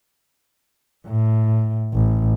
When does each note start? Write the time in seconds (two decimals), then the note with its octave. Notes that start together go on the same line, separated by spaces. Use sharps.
1.07 A2
1.94 A1